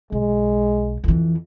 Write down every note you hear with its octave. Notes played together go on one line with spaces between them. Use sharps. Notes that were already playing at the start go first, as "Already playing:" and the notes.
B1 G#3
F2 E3